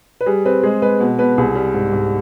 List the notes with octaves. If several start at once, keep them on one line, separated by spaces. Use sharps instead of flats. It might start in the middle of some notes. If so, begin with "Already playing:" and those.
B4
G3 G#4
C4 B4
G#3 G#4
G#3 B4
B2
B2 B4
C2 G#4
G3
G#2
G#2